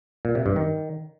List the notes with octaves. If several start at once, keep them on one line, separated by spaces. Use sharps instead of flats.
A#2
C3
G2
D#3